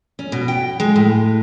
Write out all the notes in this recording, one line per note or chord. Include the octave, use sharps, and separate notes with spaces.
C#4
B2
G5
G#3
A2